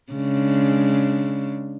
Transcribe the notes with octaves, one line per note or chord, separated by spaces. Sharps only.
C#3 G#3 D4